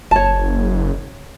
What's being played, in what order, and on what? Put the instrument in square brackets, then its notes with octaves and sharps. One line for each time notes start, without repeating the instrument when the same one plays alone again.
[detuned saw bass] F#1 [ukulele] C#5 A5